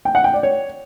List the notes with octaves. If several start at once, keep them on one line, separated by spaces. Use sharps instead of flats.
G5
F#5
G5
D5
C#5